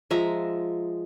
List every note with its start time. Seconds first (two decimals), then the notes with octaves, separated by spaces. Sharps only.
0.10 F3 G#3 E5 A#5